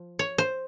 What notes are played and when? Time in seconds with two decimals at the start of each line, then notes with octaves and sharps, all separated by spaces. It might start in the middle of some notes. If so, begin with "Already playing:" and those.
Already playing: F3
0.19 C#5
0.38 C5